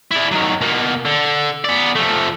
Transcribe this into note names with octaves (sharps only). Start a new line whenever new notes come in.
E4 D5
D#3 F#3
B2 A#3
D3
B3 D5
F3 A3